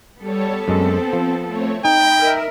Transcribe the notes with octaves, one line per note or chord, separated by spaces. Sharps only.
G3 B3 A4 C#5
F#2 G#3 C4
F3
A3 C4 C#5
D#4 D#5 G5 B5
A#4 E5